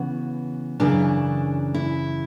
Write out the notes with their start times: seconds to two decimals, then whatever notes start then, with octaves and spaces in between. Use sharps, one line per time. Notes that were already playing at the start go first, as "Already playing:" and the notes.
Already playing: C#3 E3 B3 F#4
0.80 F#2 C#3 E3 D4
1.74 E4